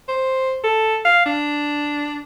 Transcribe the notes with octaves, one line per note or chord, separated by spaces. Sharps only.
C5
A4
F5
D4